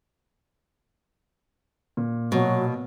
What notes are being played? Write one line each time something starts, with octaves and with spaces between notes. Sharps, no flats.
A#2
B2 F#3